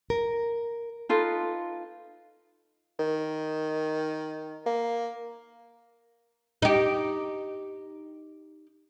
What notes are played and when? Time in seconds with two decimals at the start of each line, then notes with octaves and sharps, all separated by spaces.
0.10 A#4
1.09 D#4 F4 A4 B4
2.99 D#3
4.66 A#3
6.62 D#4 G4